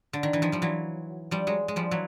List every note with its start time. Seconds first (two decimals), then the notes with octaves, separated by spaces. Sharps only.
0.13 D3
0.23 D#3
0.33 E3
0.42 D#3 F3
0.52 F3 G3
0.62 E3 F#3
1.31 F3 G3
1.47 F#3 G#3
1.68 G#3
1.76 F3 G3
1.91 E3 F#3